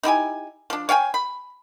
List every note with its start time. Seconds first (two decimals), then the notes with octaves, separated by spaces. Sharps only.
0.03 D#4 E4 G4 G#5
0.70 F3 D4
0.89 C#5 F5 G5 G#5
1.14 B5